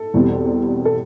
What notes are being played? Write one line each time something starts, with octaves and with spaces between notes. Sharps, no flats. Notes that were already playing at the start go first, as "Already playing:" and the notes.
Already playing: A4
E2 B2 G3 C4
A4